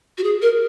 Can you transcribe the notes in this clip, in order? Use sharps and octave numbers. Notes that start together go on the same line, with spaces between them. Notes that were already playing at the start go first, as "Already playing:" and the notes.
F#4
G#4
A#4